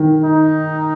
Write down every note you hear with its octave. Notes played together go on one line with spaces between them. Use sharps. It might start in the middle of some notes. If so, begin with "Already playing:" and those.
Already playing: D#3
D#4